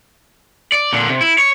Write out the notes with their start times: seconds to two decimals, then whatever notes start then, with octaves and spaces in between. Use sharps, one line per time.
0.72 D5
0.93 A#2 D3
1.09 C3
1.21 E4
1.38 C#5